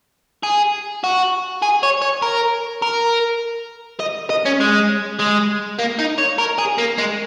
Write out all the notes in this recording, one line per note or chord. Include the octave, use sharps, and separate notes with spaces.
G#4
F#4
G#4
C#5
C#5
A#4
A#4
D#5
D#5
C#4
G#3
G#3
A#3
D#4
C#5
A#4
G#4
A#3
G#3